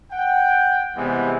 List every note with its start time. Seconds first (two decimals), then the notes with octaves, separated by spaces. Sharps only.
0.12 F#5 G5
0.96 C3 E3 G3 G#3 B3